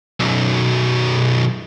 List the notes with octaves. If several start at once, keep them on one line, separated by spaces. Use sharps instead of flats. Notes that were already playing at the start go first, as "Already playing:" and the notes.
B1 F#2